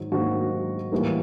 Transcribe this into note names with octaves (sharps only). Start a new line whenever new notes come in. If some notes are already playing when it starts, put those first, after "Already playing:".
Already playing: G#2 D#3 F#3
G#2 D#3 F#3 A#3 F#4
A2 E3 G3 A#3